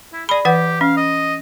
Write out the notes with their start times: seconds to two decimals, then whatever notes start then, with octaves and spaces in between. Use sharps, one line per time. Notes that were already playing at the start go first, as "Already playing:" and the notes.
0.13 E4
0.29 G#4 D5 B5
0.45 E3 G4 B4 F#5
0.81 C#4 F5
0.97 D#5